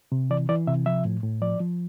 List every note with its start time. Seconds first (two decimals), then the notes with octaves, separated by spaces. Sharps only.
0.12 C3
0.30 E3 D5
0.49 E3 D5
0.67 C3 E5
0.86 F3 E5
1.05 A2
1.23 A2
1.42 F3 D5
1.60 F3